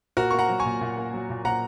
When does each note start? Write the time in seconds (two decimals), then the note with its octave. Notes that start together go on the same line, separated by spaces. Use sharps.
0.17 A#2 F#4 A#4
0.31 A#3 C#6
0.39 F#5 A#5
0.49 F#3
0.60 G#5 C#6
0.65 A#2
0.81 A#2
0.97 A#3
1.14 F#3
1.30 A#2
1.44 A#2 F#5 A#5